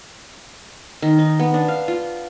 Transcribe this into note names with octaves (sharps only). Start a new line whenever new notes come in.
D#3
D#4
B3
D4
F5
F4